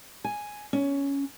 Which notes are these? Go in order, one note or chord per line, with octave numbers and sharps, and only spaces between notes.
G#5
C#4